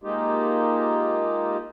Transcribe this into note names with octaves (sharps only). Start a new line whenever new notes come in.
G#3 A#3 D#4 F4 G4